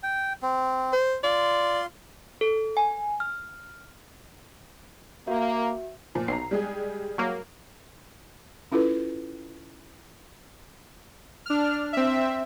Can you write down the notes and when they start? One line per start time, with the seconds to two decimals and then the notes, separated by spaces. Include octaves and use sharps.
0.03 G5
0.42 C4
0.93 C5
1.23 F4 D5 C6
2.41 A4
2.77 G#5
3.20 F6
5.27 A#3 F#4 E5
6.15 A#2 F3
6.28 B1 A#5 C7
6.51 G3 G#3 G#4
7.18 F#3 A#3
8.72 C#4 E4 F4 A4 B4
11.46 D4 F6
11.93 C4 E5